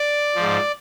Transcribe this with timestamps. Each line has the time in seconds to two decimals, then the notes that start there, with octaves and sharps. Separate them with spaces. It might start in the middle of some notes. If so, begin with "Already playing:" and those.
Already playing: D5
0.35 F3
0.41 G#2